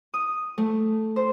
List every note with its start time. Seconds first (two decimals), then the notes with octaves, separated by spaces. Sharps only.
0.14 D#6
0.58 A3
1.16 C5